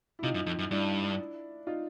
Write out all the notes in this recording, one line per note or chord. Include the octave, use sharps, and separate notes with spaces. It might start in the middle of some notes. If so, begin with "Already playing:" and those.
E4
C3 D#4 F4
F#2
F2
F#2
G2 D4 E4
D#4 F4